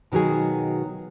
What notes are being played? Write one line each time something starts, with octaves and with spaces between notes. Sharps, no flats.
B2 D#3 F#3 F#4 G#4